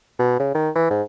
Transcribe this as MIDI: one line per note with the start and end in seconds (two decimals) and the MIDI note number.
0.19 0.38 47
0.40 0.51 49
0.54 0.70 51
0.75 0.87 52
0.90 1.02 44